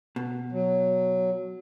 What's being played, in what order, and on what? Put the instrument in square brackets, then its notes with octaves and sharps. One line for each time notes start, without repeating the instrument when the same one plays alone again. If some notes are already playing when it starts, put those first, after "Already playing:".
[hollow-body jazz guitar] B2
[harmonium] F#3